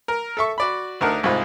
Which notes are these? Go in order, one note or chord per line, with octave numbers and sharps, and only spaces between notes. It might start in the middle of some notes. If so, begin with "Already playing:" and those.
A#4
A4 E5 C#6
F#4 D5 B5
D2 D4 D#4 A#4 F#5
C2 G#2 D#4 F4 B5